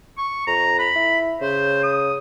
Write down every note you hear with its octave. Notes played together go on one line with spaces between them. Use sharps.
C#6
F2 A#5
B5
E4
C#3 C5
D#6